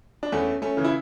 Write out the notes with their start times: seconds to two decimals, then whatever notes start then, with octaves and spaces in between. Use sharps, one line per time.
0.23 D4
0.32 E2 A3 C#4
0.62 A3 C#4
0.77 C#3 E3
0.84 E4